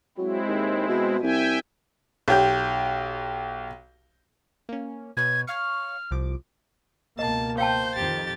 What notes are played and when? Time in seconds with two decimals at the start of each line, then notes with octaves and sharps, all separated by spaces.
0.18 F#3 G#3 C4 E4
0.48 D#2
0.89 B2
1.23 C2 E5 G5 G#5
2.28 B1 G4 G6
4.69 A#3 C#4
5.17 B2 B4 C#5 G#6
5.47 C#5 F5 C#6 F6
6.11 C2 F3 D6
7.19 C#2 B2 A#3 D#5 A5
7.58 C5 F5 G5 A5 G6
7.95 F2 D#3 G4 A6